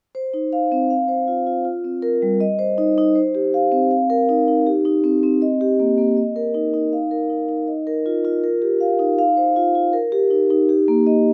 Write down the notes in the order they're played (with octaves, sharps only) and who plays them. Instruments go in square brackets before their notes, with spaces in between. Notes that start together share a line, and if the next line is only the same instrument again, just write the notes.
[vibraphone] C5
D#4
F5
C4
F5
C5
F4
F4
F4
C4
A#4
G3
D#5
C5
D#4
D#4
C5
G4
F5
C4
F5
A#4
D#4
D#4
G4
D#4
C4
C4
D#5
G4
A#3
A#3
D#5
A#4
D#4
D#4
F5
A#4
D#4
D#4
D#5
A#4
F4
F4
A#4
G4
F5
D#4
F5
C5
F4
F4
A#4
G4
D#4
D#4
G4
A#3
D#5